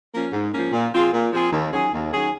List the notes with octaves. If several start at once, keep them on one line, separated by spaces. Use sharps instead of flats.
F3 A#3 C#4
G#2
F3 A#3 C#4
A#2
F3 C4 F4 G#4
A#2
F3 C4 F4 G#4
D#2
D#3 F#3 C#4 G#4
D#2
D#3 F#3 C#4 G#4